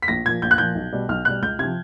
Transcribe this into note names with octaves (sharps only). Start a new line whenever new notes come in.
B6
A#1 A#6
A#2 F3 G#6
A#1 G6
F#6
A#2 F3 G6
B1
B2 G3
B1 F6
B2 G3 F#6
C#2 G6
C3 F3 G#6